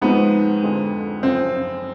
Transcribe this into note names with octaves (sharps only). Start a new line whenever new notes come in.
G#2 F3 G#3 B3 C4 D#4
F2 D3 F3 G#3
F#2 C#3 F3 C4